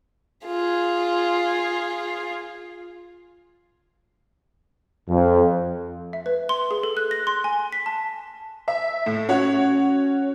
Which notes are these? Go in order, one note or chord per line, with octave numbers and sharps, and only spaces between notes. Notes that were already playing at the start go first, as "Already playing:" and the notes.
F4 G#4
F2
E5
B4
C6
G#4
A4
F#6
A#6
C6
G#5
B6
A5
E5
A2
C#4 F#4 C#5